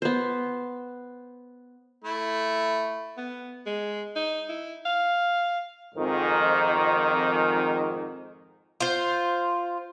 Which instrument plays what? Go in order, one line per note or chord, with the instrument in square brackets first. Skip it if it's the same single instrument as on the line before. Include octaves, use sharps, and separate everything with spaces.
[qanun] B3 C5
[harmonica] A3 E4
[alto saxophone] B3
G#3
D#4
E4
F5
[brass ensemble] F2 G#2 D#3
[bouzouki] F4 C5